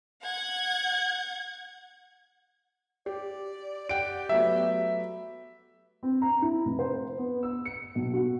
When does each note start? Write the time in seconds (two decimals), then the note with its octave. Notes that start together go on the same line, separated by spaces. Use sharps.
0.22 F#5 G#6
3.06 G4 D5
3.89 G4 D5 F#5 G5 D7
4.29 F#3 A3 B3 E5
6.03 C4
6.22 A#5
6.42 E4
6.65 F1
6.79 C5
7.18 B3
7.43 E6
7.65 C#7
7.95 B1
8.14 F#4